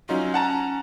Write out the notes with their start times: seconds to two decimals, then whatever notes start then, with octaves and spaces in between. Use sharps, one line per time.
0.09 F#3 C#4 D#4 F4
0.34 F#5 A5 A#5